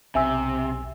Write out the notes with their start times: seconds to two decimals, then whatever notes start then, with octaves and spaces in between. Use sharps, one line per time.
0.15 B1 C3 E5 G#5 E6